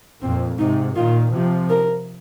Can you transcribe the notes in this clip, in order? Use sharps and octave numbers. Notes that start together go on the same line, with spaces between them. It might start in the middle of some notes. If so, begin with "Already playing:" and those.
F2 A#2 C4
G#2 C3 D#4
A#2 D#3 F4
C3 F3
A#4